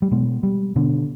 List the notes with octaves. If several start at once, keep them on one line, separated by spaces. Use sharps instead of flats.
G3
B2 G#3
G3
B2 D3